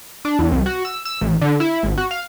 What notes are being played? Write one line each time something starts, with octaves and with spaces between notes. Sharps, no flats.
D4
E2
C2
F#4
E6
E6
A1
D3
E4
G#1
F#4
F5